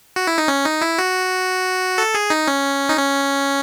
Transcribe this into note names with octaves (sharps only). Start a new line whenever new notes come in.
F#4
E4
D#4
C#4
D#4
E4
F#4
A4
G#4
D#4
C#4
D#4
C#4